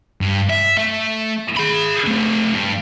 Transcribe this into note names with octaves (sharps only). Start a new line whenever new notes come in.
G2
E5
A3
G#4 B5
A3 C4
G2